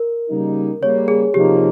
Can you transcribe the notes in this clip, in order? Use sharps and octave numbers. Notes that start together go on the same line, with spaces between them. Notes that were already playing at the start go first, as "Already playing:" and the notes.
Already playing: A#4
C#3 G3 A#3 D#4
C#3 G3 A#3 C#5
G#4
C3 F3 A#3 D#4 G4